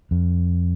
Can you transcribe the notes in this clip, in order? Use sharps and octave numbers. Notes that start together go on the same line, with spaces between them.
F2